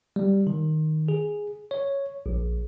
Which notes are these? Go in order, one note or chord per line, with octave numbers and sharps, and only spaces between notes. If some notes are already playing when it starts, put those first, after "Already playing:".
G3
D#3
G#4
C#5
A#1